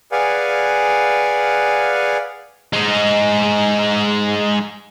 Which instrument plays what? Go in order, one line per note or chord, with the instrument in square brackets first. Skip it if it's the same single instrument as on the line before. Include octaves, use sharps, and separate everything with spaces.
[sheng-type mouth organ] G#4 B4 D5 F5 F#5 G#5
[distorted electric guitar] G#3 D#4